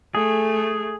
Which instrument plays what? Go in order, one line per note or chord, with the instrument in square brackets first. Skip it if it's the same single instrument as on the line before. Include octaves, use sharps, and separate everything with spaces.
[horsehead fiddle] A3 [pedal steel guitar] G#4